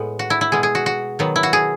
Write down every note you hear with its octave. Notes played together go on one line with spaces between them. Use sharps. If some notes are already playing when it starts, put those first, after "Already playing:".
Already playing: A2 G#3 B3
F#4
E4
E4
B2 G#3 B3 G#4
G#4
F#4
F#4
D#3 F#3 B3
E4
F#4
G#4